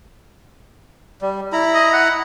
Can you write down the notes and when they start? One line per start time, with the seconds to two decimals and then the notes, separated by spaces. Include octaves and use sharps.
1.22 G3
1.53 E4 A#5 B5
1.74 D#5
1.93 F#5